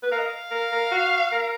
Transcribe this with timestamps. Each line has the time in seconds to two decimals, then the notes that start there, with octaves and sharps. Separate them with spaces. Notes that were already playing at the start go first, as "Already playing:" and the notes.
0.03 B4
0.11 A#4 F5
0.18 D#5
0.26 F5
0.51 A#4
0.72 A#4
0.91 F#4
1.32 A#4